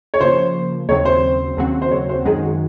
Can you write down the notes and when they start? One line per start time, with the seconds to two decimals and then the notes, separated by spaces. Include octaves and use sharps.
0.14 C#5
0.20 C#3 F3 A#3 C5
0.88 D#2 C#3 F#3 C4 C#5
1.05 C5
1.57 D#2 C#3 F#3 C4 F#4
1.82 C5
1.91 C#5
2.09 C5
2.26 F#2 D#3 G#3 G#4
2.43 F#4